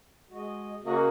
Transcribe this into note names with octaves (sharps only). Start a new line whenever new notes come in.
G#3 F#4 D#5
C#3 A#3 F#4 D#5